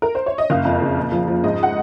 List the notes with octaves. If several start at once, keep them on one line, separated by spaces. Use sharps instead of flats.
A#4
C5
C#5
D#5
F#1 F5
F2
C#3
A#2
F3
F3
G#2 D#5
F#5